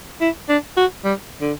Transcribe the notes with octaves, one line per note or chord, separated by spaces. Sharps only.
E4
D4
F#4
G3
D3